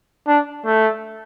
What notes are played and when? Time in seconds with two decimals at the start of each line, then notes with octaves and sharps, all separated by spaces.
0.28 D4
0.65 A3